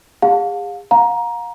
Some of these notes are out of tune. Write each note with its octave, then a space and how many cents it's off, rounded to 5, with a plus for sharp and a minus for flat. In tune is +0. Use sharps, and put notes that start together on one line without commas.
G#4 -40 F5 +35 A5 +30
F5 +40 A#5 +15